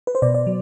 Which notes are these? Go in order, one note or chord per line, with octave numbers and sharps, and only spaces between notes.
B4
C5
B2 D5
D5
F#3